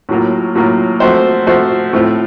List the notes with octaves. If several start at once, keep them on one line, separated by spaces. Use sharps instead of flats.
A2 F#3 A#3 F4
A2 F#3 A#3 F4
F3 A3 C4 F#4 C5
F3 A3 C4 F#4 C5
A2 A3 C4 F4